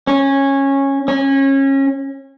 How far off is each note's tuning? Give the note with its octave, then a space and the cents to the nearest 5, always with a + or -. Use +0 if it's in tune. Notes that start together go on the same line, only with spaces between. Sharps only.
C#4 -15
C#4 -25